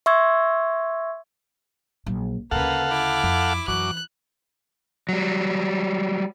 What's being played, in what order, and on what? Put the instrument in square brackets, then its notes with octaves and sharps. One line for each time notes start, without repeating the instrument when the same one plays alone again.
[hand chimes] E5 C6 C#6 E6 G#6
[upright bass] A#1 F#3
[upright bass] D2 C#3 [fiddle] A#3 B4 [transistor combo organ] A4 F5 F#5
[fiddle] E4 D6
[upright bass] F2
[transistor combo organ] F#2 D6 [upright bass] E3 [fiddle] F#6
[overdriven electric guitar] F#3 G3